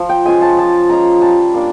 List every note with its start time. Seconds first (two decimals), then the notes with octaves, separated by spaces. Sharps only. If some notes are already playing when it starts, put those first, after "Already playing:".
Already playing: F3
0.09 G5
0.25 G#3 C#4 F4 G#5
0.42 A5
0.58 F3 A5
0.89 G#3 C#4 F4 A#5
1.22 G3 A5
1.54 A#3 D4